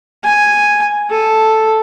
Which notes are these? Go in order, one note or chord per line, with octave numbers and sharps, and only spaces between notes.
G#5
A4